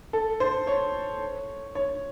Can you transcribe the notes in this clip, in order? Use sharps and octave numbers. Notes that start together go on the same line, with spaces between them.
A4
C5
C#5
C#5